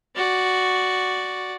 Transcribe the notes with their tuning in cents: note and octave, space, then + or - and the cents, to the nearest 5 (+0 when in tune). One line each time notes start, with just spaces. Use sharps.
F#4 +0 D5 +0